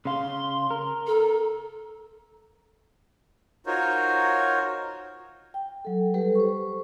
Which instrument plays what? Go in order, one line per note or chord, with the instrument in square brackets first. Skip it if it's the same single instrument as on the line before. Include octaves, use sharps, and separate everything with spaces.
[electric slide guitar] C#3 F5 [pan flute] C6
[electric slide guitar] A#4
[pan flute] A4
[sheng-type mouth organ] D#4 F4 F#4 A#4 C5 C#5
[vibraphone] G5
F#3 A4
G3 G4 A4 B4
C5 C#6